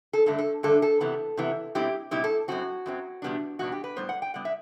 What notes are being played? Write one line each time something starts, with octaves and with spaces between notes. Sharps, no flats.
A4
G2 D3 A3 A4
A4
G2 D3 A3 A4
A4
C3 E3 B3
C3 E3 B3
B2 G3 C4 E4 G4
B2 G3 C4 E4 G4
A4
F#2 F#3 C4 F#4
F#2 F#3 C4
E2 B2 G3 B3 D4
E2 B2 G3 B3 D4 F#4
G4
B4
A2 G3 B3 C5
F#5
G5
A2 G3 B3 F#5
E5